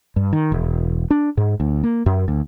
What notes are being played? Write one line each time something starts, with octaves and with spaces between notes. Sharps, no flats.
G2
D#3
E1
D4
G#2
D2
A#3
F#2
D2